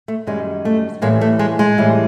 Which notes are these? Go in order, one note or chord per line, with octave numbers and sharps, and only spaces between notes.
A3
F#2 D#3 G3 G#3
A3
A2 E3 G3 G#3 A#3
A3
G#3
G#3
A2 E3 G3